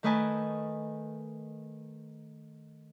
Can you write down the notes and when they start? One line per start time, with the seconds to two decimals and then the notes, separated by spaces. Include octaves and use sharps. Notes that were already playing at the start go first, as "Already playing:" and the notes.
0.03 D#3 A3 B4 D#5 G#5 A5